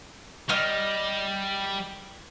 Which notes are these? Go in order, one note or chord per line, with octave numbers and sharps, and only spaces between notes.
G3 D#5 F6